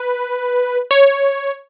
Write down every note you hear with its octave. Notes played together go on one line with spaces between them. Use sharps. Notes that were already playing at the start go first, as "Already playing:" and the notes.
Already playing: B4
C#5